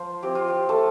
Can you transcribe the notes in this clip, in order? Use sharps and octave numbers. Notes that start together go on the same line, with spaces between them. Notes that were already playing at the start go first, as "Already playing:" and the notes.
Already playing: F3 F4 C5
C4 E4 G4
F4
G4
A3 A4